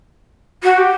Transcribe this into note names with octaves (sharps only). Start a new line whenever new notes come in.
F#4
G4